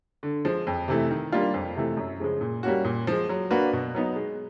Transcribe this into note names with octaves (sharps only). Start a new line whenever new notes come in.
D3
F3 G#3
F2
C3 E3 A3
D#3
G3 A#3 D4 F4
F2
C3 E3 A3
F#2
C#3 F3 G#3
A#2
G3 A#3 C#4 F#4
A#2
F3 G#3
F#3
A#3 D4 F#4 B4
B2
F#3 B3 D#4
G#3